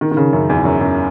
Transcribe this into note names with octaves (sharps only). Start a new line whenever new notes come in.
D#3
D#3
C#3
F#2
E2
F#2
F#2